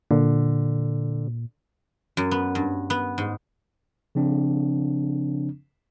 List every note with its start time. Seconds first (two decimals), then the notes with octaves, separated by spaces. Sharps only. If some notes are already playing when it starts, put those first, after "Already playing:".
0.11 A#2 D3
2.17 F#2
2.31 B3
2.55 G2
2.90 B3
3.18 G#2
4.15 C#3 F3 C4 D4